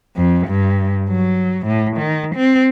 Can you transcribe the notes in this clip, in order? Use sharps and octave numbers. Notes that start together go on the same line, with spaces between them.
F2
G2
F#3
A2
D#3
C4